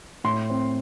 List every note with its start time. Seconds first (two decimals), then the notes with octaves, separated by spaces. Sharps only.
0.24 A2 C6
0.50 C4